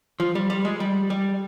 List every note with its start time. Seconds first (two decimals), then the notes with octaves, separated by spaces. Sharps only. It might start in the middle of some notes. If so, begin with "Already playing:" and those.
0.20 F3
0.35 G3
0.50 G3
0.65 G#3
0.80 G3
1.10 G3